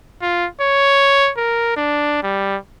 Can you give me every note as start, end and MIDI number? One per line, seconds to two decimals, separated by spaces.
0.22 0.47 65
0.61 1.31 73
1.37 1.75 70
1.77 2.19 62
2.23 2.57 55